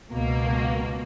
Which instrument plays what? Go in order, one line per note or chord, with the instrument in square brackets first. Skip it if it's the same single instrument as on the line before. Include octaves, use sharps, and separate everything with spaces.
[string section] C#2 B2 A#3